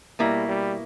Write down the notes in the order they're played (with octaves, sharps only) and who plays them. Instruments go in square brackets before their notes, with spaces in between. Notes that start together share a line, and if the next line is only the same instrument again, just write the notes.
[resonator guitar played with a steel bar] B2 A#3 E4 [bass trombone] G3
[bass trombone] G3